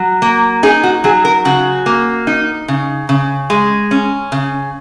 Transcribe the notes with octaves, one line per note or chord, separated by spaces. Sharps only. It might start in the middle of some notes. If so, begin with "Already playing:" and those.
Already playing: F#3
A#3
D#4 G#4
F#4
F#3 G#4
A#4
C#3 F#4
A#3
D#4
C#3
C#3
G#3
C#4
C#3